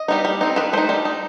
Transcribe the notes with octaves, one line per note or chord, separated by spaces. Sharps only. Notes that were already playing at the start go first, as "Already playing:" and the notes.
Already playing: D#5
G3 B3 D#4
G3
C4 D#4
D#3 B4
A3 D#4 C5
G3
D#4